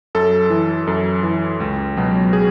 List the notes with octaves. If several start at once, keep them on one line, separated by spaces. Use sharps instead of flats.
F#2 A4
E3
F#2 A4
E3
C#2
B2 F#3
G#4